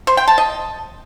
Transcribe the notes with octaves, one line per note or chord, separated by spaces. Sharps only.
C5
G5
A5
D#5